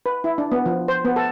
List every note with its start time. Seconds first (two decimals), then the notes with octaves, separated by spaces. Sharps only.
0.06 B4
0.24 E4
0.38 D4
0.52 B3
0.66 F3
0.88 C5
1.05 B3
1.16 A4